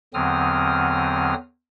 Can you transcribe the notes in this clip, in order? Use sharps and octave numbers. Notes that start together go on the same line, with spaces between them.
E2 D3 F#3 C4 D#6 F6